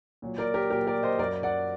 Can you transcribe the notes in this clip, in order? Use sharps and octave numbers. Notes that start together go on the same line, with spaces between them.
A#2 F#3
A#4 D5
G4 A#4
A#2 F#3 G4 A#4
A#4 D5
C5 D#5
F#2 F#3 A#4 D5
D5 F#5